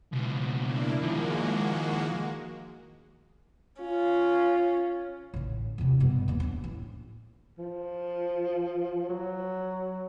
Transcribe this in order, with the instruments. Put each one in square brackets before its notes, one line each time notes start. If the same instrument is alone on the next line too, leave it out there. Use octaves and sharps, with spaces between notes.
[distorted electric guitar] C#2 B2
[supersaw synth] A#3 D4 E4
[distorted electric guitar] D#3 F3 [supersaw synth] G#3 A#3 F#4
[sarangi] C#4 [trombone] F4
[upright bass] A1 D3
E2 C3
G2 B2
D#2 E3
C#4 D4
A1
[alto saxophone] F3
F#3